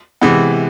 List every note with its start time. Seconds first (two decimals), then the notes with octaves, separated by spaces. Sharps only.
0.21 C3 E3 G#3 B3